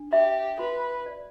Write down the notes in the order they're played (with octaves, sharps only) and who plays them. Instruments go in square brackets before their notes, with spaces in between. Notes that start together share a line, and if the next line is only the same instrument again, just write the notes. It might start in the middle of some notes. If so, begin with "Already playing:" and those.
Already playing: [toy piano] D4
[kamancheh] G4 [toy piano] E5
[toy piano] F#4 [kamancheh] B4
[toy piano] D5